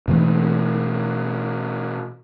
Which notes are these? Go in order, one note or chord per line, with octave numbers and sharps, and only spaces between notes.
B2 E3 A3